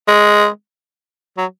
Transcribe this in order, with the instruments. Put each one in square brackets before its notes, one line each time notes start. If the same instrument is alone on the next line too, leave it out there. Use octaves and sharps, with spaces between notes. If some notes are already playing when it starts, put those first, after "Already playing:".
[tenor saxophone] G#3
F#3